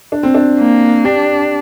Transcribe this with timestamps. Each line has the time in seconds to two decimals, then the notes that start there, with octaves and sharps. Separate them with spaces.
0.12 D4
0.23 C4
0.34 D4
0.59 A#3
1.04 D4 G4